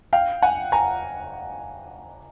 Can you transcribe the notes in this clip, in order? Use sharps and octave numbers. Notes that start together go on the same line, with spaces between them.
F5 G5
F#5 G#5
G#5 A#5